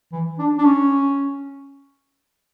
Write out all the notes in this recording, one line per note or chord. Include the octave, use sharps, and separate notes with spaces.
E3
D4
D4
C#4